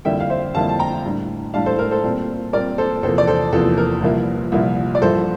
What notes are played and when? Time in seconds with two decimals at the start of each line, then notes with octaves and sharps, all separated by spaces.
0.05 F2 D3 G3 A#3 E4 E5 G5
0.20 F5
0.30 C5 E5
0.55 F2 D3 G3 A#3 E4 F5 A5
0.69 A5
0.79 G5 A#5
1.04 A2 G3 D4
1.54 A2 G3 D4 F5 A5
1.66 A4 C5
1.79 A#4
1.91 A4 C5
2.04 A#2 G3 C4
2.53 A#2 G3 C4 A#4 D5
2.78 A4 C5
3.03 E2 C3 F3 A#3 A4 C5
3.18 D5
3.27 A4 C5
3.53 E2 C3 F3 A#3 A4
3.78 A#4
4.02 C2 A#2 F3 A#3 E4
4.52 C2 A#2 F3 A#3 E4
4.95 D5
5.02 G2 F3 A#3 E4 A4 C5